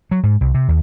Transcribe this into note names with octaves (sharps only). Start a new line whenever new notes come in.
F#3
G#2
C2
C3
D#2